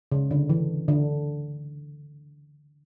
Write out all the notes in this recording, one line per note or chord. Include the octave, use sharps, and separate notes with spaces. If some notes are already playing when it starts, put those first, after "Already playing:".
C#3
D3
E3
D3